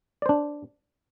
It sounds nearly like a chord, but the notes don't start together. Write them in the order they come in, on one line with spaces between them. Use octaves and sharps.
D5 C5 D4